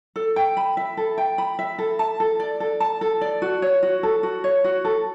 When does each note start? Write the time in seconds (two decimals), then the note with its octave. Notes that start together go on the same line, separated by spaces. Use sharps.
0.16 A4
0.36 G5
0.57 B5
0.77 E5
0.97 A4
1.18 G5
1.38 B5
1.59 E5
1.79 A4
1.99 A5
2.20 A4
2.40 D5
2.60 A4
2.80 A5
3.01 A4
3.21 D5
3.42 F#4
3.62 C#5
3.83 F#4
4.03 A4
4.23 F#4
4.44 C#5
4.64 F#4
4.85 A4